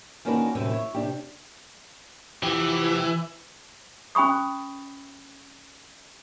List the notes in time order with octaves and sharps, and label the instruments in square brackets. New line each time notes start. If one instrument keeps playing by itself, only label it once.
[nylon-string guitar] D#3 A#3 C#4 D4 F#4 B4
F#2 A2 C3 E3
E4 C5 C#5
C3 D4 G4
[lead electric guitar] E3 [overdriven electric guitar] F3 G4
[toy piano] C#4 G5 B5 C#6 D#6